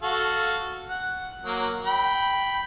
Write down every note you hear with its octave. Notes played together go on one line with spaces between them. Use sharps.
F#4 A4 F5
F#5
F#3 A#3
G5 B5